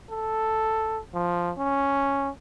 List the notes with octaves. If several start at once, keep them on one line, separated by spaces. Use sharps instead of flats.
A4
F3
C#4